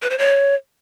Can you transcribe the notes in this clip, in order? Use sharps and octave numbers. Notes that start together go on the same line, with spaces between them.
B4
C5
C#5